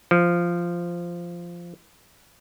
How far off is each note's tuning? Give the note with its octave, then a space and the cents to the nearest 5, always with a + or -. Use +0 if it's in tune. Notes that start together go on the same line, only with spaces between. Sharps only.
F3 -10